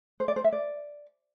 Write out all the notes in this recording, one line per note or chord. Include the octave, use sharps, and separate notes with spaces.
C5
D5
C5
E5
D5